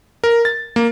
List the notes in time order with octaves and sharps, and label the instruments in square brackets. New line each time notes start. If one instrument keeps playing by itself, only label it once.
[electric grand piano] A#4
A6
A#3